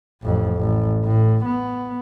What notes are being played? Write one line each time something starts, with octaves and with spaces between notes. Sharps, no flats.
A1 F2
A1
A2
B3